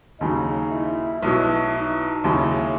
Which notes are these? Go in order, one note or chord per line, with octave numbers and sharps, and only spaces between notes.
D#2 C#3 F#3 D#4
E4
B1 B2 F#3 E4
D#4
D#2 C#3 F#3 E4